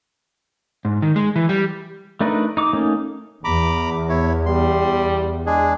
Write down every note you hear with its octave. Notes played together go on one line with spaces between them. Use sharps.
G#2
D#3
G#3
E3
G3
A3 D4 D#4 A#4 B4
D#4 D6
A3 A#3 C#4 D#4
E2 A#5 B5 D6
E4 C#5
G3 C6
G#3 D4 G#4